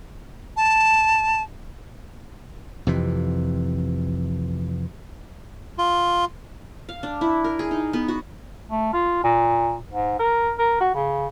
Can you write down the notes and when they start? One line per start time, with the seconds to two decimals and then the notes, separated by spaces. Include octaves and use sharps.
0.57 A5
2.87 F2 C3 E3
5.78 F4
6.89 F5
7.03 D4
7.21 E4
7.44 A#4
7.59 G#4
7.71 D#4
7.93 B3
8.08 F#4
8.70 A3
8.93 F4
9.24 A#2
9.92 G#2
10.19 A#4
10.59 A#4
10.80 F#4
10.95 C#3